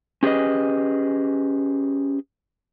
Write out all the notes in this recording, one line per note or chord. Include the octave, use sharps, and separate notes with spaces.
C#4 G4 G#4 B4 D#5